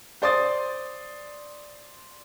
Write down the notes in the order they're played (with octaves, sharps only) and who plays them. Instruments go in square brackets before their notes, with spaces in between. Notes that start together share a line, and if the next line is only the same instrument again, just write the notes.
[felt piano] C5 D5 C6 D#6 A6